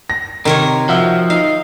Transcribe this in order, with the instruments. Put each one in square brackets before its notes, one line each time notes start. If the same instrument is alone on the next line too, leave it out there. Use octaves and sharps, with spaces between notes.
[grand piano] A#6
[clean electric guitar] C3 [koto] D#3 A#4 C#5
[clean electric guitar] F3 [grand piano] F#4 E5
[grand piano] D#4 [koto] F5